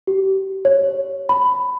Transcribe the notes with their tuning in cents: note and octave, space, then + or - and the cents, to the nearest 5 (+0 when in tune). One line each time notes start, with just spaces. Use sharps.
G4 -30
C#5 -5
B5 +15